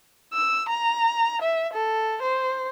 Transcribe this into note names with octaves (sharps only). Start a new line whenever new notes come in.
E6
A#5
E5
A4
C5